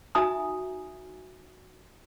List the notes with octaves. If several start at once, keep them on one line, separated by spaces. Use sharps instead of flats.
D#4 F#4 E5 G#5 A#5 D#6